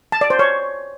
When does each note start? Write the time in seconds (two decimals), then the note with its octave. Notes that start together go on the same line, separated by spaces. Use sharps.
0.12 A5
0.21 D5
0.30 C5
0.39 C#5